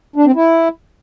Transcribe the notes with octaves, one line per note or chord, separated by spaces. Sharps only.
D4
C4
E4